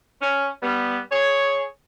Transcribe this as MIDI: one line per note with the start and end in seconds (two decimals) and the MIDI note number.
0.22 0.47 61
0.62 0.99 55
0.62 0.99 59
1.12 1.63 68
1.12 1.63 73